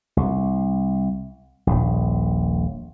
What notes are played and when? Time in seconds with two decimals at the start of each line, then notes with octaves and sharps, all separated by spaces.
0.17 C2
1.67 D#1 A#1